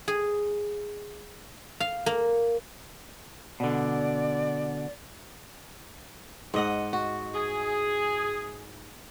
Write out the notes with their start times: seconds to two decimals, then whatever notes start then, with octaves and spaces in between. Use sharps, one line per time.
0.08 G#4
1.80 F5
2.06 A#3
3.60 B2 D3 D5
6.54 G#2 D#5 F#5
6.93 F#4
7.34 G#4